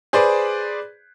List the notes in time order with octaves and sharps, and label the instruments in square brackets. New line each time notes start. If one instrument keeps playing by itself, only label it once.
[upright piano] G#4 B4 C5 D5